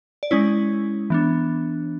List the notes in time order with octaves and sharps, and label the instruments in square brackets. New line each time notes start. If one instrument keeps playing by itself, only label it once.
[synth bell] D5
G#3 C#4 E4 C#5
E3 B3 D4